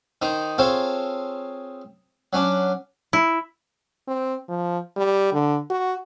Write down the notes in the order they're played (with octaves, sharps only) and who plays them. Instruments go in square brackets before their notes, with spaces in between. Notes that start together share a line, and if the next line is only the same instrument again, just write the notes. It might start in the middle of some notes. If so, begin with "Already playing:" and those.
[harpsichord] D#3 D#4 C5
C4 F4 G#4 A4 C5 C#5
F#3 C#4 D4
[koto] E4
[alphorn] C4
F3
G3
D3
F#4